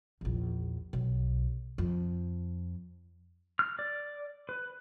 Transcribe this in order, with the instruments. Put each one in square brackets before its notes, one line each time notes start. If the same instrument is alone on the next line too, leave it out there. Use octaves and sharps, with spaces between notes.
[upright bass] A#1 E2
B1
F2
[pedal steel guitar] F6
D5
B4